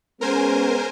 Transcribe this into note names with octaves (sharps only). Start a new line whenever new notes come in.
G#3 B3 C#4 A#4 C5 G#5